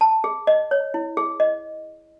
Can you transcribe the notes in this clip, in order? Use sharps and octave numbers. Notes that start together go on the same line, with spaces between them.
A5
G#4
D#5
C#5
E4
G#4
D#5